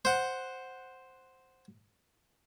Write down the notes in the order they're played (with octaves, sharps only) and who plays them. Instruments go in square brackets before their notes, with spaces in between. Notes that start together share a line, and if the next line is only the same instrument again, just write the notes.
[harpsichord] C5 F#5